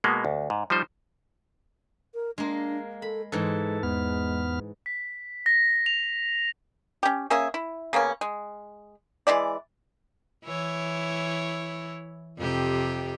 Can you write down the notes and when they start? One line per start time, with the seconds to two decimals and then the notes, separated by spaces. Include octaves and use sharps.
0.04 B2 G#3 A#3 B3
0.25 D2
0.50 G#2
0.70 F3 G3 D#4 C5
2.14 A#4
2.38 G#3 A#3 D4
3.02 A4 B5
3.32 G#2 E3 G#3 A4
3.83 E2 G#3 B3 F6
4.86 B6
5.46 A#6
5.86 F7
7.03 C#4 G4
7.30 A#3 C#4 G#4 E5
7.54 E4
7.93 C#3 A#3 B3 C#4
8.21 G#3
9.27 E3 G#3 E4 D5
10.44 E3 E4 C#5
12.38 F2 C3 G4